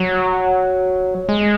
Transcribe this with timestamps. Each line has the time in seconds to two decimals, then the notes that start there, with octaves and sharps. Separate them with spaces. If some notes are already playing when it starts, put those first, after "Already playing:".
Already playing: F#3
1.29 G#3